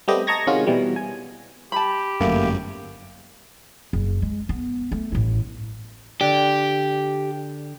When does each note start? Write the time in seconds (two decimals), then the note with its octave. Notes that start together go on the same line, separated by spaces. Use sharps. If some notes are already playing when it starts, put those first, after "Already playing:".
0.08 G3 A3 B3 C4 G4 D#5
0.27 D#5 A5 A#5 C#6 G#6 A#6
0.47 C3 D#3 G#3 C#4 F4 F#4
0.67 B2 E3 G3
0.96 G#5
1.72 G4 A5 B5
2.21 G1 F#2 A3 A#3
3.93 F#1
4.22 G#3
4.49 B3
4.92 A3
5.12 A1 E4
6.21 D3 G4 D5